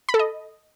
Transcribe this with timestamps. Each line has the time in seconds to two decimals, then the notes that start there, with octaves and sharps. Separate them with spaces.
0.09 B5
0.14 A4
0.19 D#5